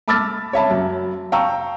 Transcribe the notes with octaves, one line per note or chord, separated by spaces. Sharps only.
A5 B5 D6 E6 F6 A6
C#5 E5 A5 B5
F#2
F5 G5 A5 A#5 C#6 E6